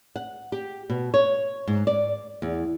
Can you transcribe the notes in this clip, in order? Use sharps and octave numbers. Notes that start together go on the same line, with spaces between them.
F#5
G4
B2
C#5
G#2
D5
E2